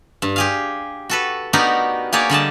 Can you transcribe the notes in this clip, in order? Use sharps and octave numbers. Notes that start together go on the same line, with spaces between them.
G2
G4 G#4 F5
F#4 A4 B4
B3 D4 D#4 F#4 G4 A#4
A#3 G4 G#4 C#5 D5
D3 G3 D#5 A5